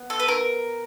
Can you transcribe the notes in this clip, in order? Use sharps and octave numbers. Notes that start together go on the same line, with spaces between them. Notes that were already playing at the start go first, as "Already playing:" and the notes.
Already playing: B3
A4
B4
A#4